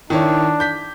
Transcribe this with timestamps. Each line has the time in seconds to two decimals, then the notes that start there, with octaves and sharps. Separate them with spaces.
0.10 D#3 D4 E4 C#5
0.60 G6 B6